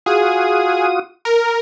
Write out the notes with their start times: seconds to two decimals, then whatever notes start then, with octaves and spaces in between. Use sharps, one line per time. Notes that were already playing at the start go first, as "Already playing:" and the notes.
0.06 F4 F#4 G#4 D#6
1.25 A#4